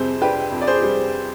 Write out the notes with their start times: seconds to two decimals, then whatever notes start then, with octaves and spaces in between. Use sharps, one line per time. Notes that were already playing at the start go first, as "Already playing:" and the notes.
Already playing: F2 C3 G3 G#4 C5
0.21 D4 G4 B4
0.52 F2
0.62 D5
0.67 G#4 C5
0.82 G3